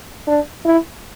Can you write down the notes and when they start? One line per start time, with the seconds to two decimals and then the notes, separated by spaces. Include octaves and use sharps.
0.27 D4
0.65 E4